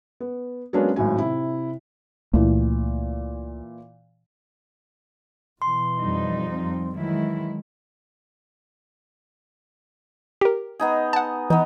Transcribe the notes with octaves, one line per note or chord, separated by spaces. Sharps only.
B3
F#3 G#3 A#3 B3 C#4 D4
G#1 A2 F#3 G#5
C3 E4
C#2 A#2 E3 A3
B2 E3 C6
F2 G3 D#4
F3 C4
D#3 E3 F#3 G#3 E4
G4 A#4
B3 D#4 G#4
F#5 A5
E3 B3 D#4